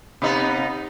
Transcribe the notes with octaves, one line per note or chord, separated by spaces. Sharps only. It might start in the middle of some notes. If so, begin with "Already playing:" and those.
C3 B3 D#4